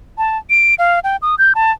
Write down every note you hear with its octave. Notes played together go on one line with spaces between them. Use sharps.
A5
D7
F5
G5
D#6
G6
A5